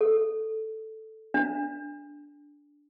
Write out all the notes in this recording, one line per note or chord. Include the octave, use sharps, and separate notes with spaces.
A4
D4